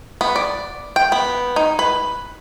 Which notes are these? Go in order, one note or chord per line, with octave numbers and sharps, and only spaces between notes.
B3
D5
G5
B3
D#4
B4